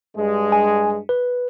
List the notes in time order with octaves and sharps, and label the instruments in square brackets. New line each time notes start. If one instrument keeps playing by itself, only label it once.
[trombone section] G2 G#3
[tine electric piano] G#5
B4